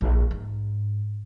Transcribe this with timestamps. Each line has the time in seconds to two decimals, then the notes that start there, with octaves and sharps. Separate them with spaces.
0.01 A#1
0.31 G#2